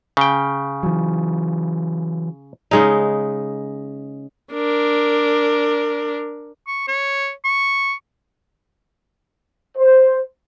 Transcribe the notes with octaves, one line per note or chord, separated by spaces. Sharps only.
C#3 G5
E3 F#3
C#3 G#3 D#4
D4 A#4
C#6
C#5
C#6
C5